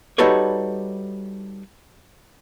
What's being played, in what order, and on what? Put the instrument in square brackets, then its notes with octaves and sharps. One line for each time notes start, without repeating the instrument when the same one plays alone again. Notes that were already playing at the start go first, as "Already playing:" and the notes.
[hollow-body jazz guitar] G3 D#4 F#4 A4 B4 C#5